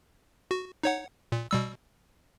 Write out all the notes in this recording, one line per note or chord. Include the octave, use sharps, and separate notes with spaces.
F#4
D#4 C#5 F#5
A#2
B2 G3 E6